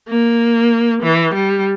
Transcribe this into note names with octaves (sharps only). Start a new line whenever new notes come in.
A#3
E3
G3